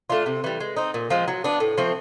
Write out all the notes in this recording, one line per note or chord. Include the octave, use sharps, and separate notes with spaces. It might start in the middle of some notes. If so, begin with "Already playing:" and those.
A3 D4 F4
C3
E3 G3
G#3
C4 D#4
A#2
F3 G#3 C4
F#3
B3 D4
A2
F3 A3 C4